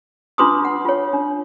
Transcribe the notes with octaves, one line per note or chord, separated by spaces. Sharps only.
D4 F4 B4 C6 D6 D#6
F#5
F4 C#5
D4